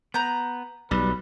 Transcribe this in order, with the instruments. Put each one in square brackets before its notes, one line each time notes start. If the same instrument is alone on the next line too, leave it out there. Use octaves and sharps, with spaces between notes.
[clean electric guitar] B3 [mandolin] A#5 G6
[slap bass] B1 [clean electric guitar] G3 [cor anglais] B4